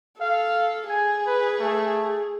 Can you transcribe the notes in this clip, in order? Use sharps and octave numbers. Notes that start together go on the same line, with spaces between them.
A4 F5
G#4 G#5
B4
A3